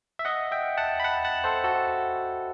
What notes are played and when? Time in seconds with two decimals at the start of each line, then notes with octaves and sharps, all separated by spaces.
0.19 E5
0.25 D#5 F#5
0.51 E5 G5
0.77 F#5 A5
1.00 B5
1.04 F#5 A5
1.25 F#5 A5
1.44 A4 C5
1.64 F#4 A4